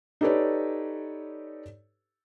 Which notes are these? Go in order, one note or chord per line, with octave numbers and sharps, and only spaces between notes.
D#4 G4 A4 B4 C#5 D5